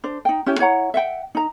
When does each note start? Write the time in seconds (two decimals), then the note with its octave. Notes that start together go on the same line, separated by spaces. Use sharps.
0.04 D4 C5
0.25 D#4 G5
0.46 C#4 E4 G4
0.59 E4 C#5 F#5 A#5
0.94 E5 F#5 G5
1.35 D#4 A#5